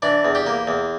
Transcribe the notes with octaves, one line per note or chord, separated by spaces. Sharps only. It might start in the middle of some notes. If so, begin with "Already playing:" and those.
E3 D4
E2
G4
A#3
E2